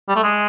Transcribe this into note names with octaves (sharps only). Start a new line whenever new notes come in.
G3
A3
G#3